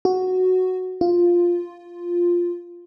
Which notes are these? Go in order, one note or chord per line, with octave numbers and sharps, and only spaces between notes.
F#4
F4